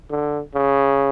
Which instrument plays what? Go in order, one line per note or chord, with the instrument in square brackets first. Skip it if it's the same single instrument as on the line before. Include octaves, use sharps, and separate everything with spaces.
[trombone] D3
C#3